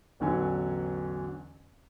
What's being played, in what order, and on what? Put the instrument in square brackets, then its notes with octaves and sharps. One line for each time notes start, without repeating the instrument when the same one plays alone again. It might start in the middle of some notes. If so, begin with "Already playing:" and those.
[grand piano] A1 E2 D3 F#3 G#5